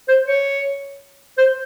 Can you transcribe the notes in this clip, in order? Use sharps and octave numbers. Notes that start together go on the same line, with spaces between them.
C5
C#5
C5